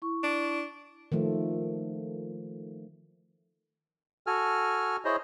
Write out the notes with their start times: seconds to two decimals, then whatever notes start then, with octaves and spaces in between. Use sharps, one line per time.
0.02 E4 C#6
0.23 D4
1.12 D#3 F3 A3
4.27 F#4 A4 G#5 F6
5.05 E4 G#4 C5 C#5 D#5